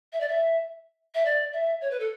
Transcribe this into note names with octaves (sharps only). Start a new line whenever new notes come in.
E5
D5
E5
E5
D5
E5
C#5
B4
A4